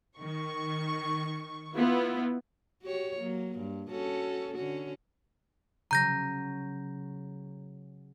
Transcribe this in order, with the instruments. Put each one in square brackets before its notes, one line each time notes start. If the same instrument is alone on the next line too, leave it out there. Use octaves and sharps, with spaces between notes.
[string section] D#3 C#6
[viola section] B3 E4 F4
[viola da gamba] F#4 G4 C#5
F#3 A#3
G2
C#4 F#4 A4
D3 C#4 F#4
[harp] C#3 F#3 [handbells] A#5 G6 A#6